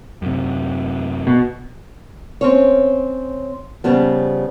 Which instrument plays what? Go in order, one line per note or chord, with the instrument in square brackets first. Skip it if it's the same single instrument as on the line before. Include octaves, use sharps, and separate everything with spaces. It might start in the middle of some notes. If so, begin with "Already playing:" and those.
[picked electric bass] F#2 C3
[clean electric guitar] B2
[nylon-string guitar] C4 C#4 C#5
C#3 F3 G3 B3